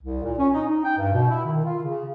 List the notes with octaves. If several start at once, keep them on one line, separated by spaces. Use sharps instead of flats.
C2
A#2
C#4
D#4
D#4
G5
G2
B2
E4
D#3
F4
C#3